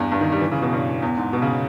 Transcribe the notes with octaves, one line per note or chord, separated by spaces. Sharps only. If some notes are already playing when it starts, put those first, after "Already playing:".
Already playing: E2 G2
G2
D#3
G3
E3
C#3
B2
G2
E2
G#2
B2
C#3